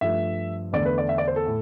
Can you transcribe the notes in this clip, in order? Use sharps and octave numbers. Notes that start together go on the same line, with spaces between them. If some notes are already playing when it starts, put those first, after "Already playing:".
G2 F3 A3 E5
E2 D3 A3 D5
B4
D5
E5
D5
C5
A4
A2